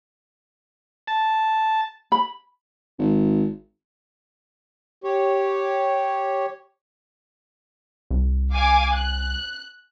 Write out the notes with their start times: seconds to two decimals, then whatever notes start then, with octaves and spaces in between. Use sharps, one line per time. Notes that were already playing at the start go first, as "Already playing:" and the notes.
1.07 A5
2.12 B5
2.99 G#1
5.04 G4 C#5
8.10 C2
8.52 F5 G#5 D6
8.94 F#6